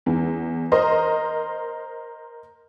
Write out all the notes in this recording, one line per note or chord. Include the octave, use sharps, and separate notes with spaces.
E2
A#4 C5 D#5 C6